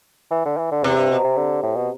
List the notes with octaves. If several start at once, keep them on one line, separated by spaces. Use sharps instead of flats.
E3
D3
E3
D3
E2 C3
G2
B2
C3
D3
A2
B2